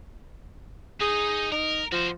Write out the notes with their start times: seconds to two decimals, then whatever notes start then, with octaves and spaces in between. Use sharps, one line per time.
1.01 D#4 G#4 D#5
1.52 D#4 A#4
1.92 F3 F#4 C5